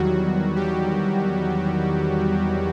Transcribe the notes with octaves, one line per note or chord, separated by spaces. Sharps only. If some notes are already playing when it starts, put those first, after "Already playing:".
Already playing: E2 D#3 F#3 G3 F#4
G3 G4